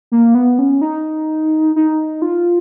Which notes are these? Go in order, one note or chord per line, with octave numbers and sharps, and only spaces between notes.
A#3
B3
C#4
D#4
D#4
F4